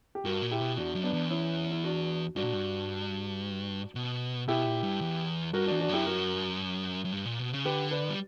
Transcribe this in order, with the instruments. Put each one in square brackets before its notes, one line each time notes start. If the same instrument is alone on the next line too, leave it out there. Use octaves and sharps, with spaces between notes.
[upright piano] G4
[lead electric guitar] G2 [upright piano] F#4 A#4
[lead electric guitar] A#2
[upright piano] E4 G4
[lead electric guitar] B2
[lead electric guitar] E2 [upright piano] D4 F#4
[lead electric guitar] F#2
[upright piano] B3 D4
[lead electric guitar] E2
[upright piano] C#4 E4
E4
D4 F#4
[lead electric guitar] G2 [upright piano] D4 F#4
[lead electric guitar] A#2
G2
B2
[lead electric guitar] B2 [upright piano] E4 G4
[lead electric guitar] A#2
G2
E2
[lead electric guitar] G2 [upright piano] F#4 A#4
[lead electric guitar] E2 [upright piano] D4 F#4
[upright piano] D4 F#4
[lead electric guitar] F#2 [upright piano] E4 G4
[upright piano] F#4 A#4
[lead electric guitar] F#2
G2
A#2
B2
C#3
[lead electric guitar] D3 [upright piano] G4 B4
[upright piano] B4 D5
[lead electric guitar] G3